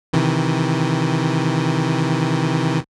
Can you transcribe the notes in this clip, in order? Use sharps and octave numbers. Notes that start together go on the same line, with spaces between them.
C3 D#3 E3